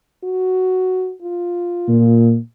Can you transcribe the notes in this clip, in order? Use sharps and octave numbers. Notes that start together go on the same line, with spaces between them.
F#4
F4
A#2